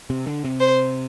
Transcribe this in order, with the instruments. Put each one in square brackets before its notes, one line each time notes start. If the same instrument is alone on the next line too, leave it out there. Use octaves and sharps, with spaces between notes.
[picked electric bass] C3
D3
C3
[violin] C5